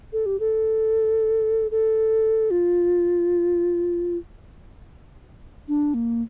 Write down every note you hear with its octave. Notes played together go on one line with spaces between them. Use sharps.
A4
G4
A4
A4
F4
D4
A#3